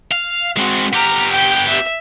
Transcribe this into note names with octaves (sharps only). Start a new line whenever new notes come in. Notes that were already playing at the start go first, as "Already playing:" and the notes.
F5
G#3 C4 F#4
B3 G4 A#5 F6
G5 G6
E5